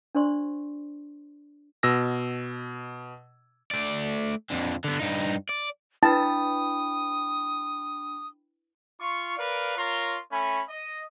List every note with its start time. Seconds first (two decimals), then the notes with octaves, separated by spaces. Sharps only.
0.15 D4 F#4 C5 D5 C6 C#6
1.83 B2 E6 A#6
3.71 A3 D5
4.50 F2 D3
4.84 D3 B3
4.99 G2 D#4
5.49 D5
6.03 D4 E4 B4 G5 A5 B5 D#6
9.00 F4 C#6
9.37 A#4 B4 D5 F5
9.77 F4 A#4 C#5 C6
10.31 A3 C#4 G#5 B5
10.69 D#5